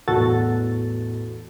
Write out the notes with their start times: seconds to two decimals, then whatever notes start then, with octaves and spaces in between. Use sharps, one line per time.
0.08 A1 E2 F#4 A4 A6